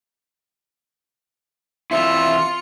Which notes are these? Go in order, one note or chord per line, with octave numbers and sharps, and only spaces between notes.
E3 C4 E4 F4 E5 C6 C#7